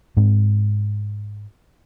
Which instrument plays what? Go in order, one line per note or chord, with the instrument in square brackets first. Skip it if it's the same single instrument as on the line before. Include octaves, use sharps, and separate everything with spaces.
[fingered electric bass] G#2 G#3 C4